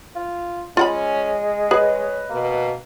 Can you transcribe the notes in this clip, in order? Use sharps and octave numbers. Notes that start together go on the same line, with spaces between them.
F4
G#3 C#4 F4 F#5 B5
G#4 B4 C#5 D#5
B2 A#3